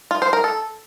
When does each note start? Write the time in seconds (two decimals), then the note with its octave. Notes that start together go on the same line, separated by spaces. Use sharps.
0.11 F4
0.22 C5
0.33 A#4
0.44 A4